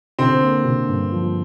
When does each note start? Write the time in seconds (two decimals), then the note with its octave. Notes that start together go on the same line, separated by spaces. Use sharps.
0.19 D3 C4
0.42 A#3
0.65 D3
0.89 G2
1.12 F3